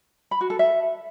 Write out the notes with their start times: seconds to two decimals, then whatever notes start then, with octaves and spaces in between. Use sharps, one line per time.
0.31 B5
0.41 F#4
0.50 A4
0.59 E5